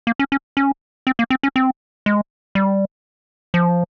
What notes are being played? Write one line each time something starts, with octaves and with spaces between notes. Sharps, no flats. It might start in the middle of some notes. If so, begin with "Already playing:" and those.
A#3
C#4
C#4
C#4
C4
A#3
C4
C#4
C4
G#3
G3
F3